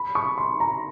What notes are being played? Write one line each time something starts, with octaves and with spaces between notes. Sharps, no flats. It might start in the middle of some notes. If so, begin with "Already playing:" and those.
Already playing: B5
C#6
C6
A#5